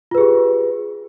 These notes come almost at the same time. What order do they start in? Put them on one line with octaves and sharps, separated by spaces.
F4 B4 G#4 G4